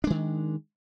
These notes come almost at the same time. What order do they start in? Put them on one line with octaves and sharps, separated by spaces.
D4 G#3 D#3